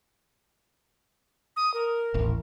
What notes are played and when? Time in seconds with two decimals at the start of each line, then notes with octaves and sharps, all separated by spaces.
1.56 D#6
1.74 A#4
2.14 D#1 A1